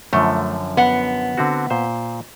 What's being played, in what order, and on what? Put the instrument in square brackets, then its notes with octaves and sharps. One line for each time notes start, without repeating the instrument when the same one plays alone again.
[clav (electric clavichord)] F#2 D3 F3 [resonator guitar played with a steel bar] A3
[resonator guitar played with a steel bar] B3 F#5
[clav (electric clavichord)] D3 C4 F#4
A#2 C5